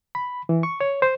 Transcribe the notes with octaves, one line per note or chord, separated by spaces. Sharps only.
B5
E3
C#6
C#5
C5